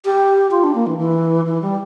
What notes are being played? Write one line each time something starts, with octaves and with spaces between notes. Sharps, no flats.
G4
F4
D4
A#3
E3
E3
E3
G3